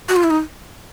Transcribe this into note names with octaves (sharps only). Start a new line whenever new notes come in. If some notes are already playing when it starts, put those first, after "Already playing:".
F#4
F4
E4
D#4